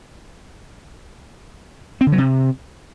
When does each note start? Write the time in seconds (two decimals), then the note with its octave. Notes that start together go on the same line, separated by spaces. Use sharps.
2.01 C4
2.07 D3
2.12 F#3
2.18 C3